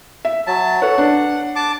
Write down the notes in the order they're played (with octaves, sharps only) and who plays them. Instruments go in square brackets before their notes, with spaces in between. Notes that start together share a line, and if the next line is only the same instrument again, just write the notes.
[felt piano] E5
[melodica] F#3 A5
[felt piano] A4 B4 C#5 [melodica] F#5
[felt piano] D4
[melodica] A5 D6